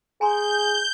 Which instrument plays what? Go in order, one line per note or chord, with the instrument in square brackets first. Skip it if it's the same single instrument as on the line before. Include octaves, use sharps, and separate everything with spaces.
[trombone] G#4 [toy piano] G#5 A#5 C6 [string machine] G6